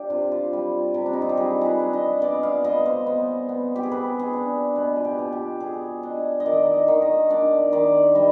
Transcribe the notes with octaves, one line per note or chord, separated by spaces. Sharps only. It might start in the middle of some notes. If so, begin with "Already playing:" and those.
Already playing: D4 G4
C3 F4
F4
G3
C3
D4
D#4
F4
G4
G3 G#4
G#4 B4
D4
D#5
B3 D5
F5
B3 D#5
C5
B3
B3
G4
G#4
B3 B4
G#4
D4
B2 B4
F4
G4
B2
G4
B3 G#4
D4 D#5
D#5
D#3 D5
D#5
D#3
D#5
D4 D5
D#3 D5
G3 D#5